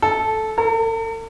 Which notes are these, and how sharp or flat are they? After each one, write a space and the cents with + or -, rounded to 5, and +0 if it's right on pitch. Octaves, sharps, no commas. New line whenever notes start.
A4 -10
A4 +45